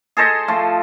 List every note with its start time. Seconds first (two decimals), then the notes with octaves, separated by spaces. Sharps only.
0.17 G#4 A4 C5 D#5
0.48 F3 A3